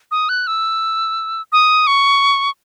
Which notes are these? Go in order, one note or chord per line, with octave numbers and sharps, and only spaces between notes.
D#6
F#6
E6
D#6
C#6